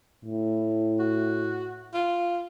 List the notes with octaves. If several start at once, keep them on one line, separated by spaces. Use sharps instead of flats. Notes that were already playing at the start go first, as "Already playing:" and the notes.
A2
F#4
F4